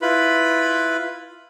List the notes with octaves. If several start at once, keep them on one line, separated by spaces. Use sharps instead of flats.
E4 F4 B4 B5